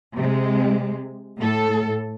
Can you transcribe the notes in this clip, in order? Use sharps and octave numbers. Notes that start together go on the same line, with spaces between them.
C3 G#3
A2 A4